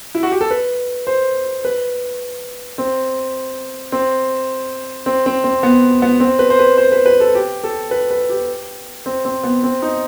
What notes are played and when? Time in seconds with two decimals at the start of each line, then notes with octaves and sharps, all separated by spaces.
0.15 E4
0.23 F#4
0.32 G4
0.41 A4
0.51 B4
1.07 C5
1.65 B4
2.78 C4
3.92 C4
5.06 C4
5.26 C4
5.44 C4
5.63 B3
6.02 B3
6.20 C4
6.39 B4
6.50 C5
6.59 B4
6.78 C5
6.92 B4
7.06 B4
7.20 A4
7.35 G4
7.64 A4
7.91 B4
8.11 B4
8.30 G4
9.06 C4
9.25 C4
9.44 B3
9.64 C4
9.82 D#4